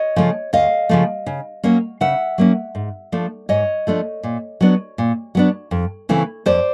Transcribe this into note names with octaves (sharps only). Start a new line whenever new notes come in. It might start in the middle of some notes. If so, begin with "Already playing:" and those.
Already playing: C#5 D#5
C#3 F3 A3
D2 D#5 F5
C#3 F3 A3
C#3
F#3 A#3 C#4
C#3 E5 F#5
F#3 A#3 C#4
G#2
F3 A3 D4
G#2 C#5 D#5
F3 A3 D4
A#2
F#3 B3 D4
A#2
F#3 B3 D4
F2
C#3 E3 A3 C4
F2 C5 D5